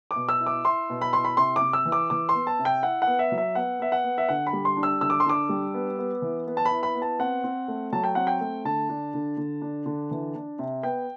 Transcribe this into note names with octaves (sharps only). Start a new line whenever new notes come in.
D6
B2
E6
E4
D6
E4 C6
B2
B5
E4 C6
B5
C3 C6
D6
C3
E6
E3
D6
E3 D6
C6
B3
A5
C3
G5
E4 F#5
F#5
B3
E5
F#3
E5
B3 F#5
B3 E5
F#5
B3
E5
D3 F#5
B5
G3
C6
D4
E6
D3 E6
D6
C6
D4 D6
G3
B3
B3
E3
B3
A5
B5
E4
B5
B3
A5
C4 F#5
C4
A3
F#3 A5
G5
C4 F#5
G5
A3
D3 A5
D4
D3
D3
D4
D3
E3
D4
C3
B3 G5